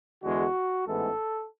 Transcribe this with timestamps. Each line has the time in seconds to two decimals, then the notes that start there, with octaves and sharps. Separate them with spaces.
0.22 E2 D3 G#3 F#4
0.86 A1 G#2 E3 G#3 B3 A4